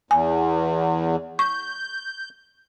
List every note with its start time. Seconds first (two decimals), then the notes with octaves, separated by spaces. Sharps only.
0.11 E2 G#5
1.39 C#6 G6